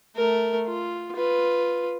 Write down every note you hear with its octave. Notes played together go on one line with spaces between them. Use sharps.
A3 A#4
F4
F4 B4